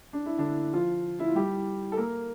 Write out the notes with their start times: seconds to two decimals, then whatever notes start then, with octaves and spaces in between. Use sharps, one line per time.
0.13 D4
0.26 E4
0.38 D3 D4
0.73 F3 F4
1.20 E4
1.28 F4
1.35 G3 G4
1.92 A4
1.97 A#3 A#4